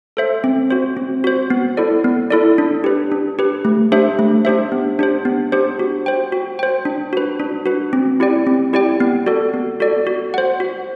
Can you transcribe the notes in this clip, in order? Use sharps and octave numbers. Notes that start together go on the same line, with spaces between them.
A4 C5 E5
C4
F#4 C5
C4
F#4 C5
B3
E4 A4 D5
B3
E4 A4 D5
D4
G4 B4
D4
G4 B4
A3
D4 G4 C5 E5
A3
D4 G4 C5 E5
B3
D4 G4 C5
B3
D4 G4 C5
F#4
C5 G5
F#4
C5 G5
D4
F#4 B4
D4
F#4 B4
C4
E4 G4 D5 G5
C4
E4 G4 D5 G5
B3
F#4 A4 D5
B3
F#4 A4 D5
F#4
C5 F#5
F#4